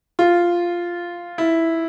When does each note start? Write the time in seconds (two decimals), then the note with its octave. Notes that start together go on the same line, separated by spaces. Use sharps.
0.19 F4
1.38 E4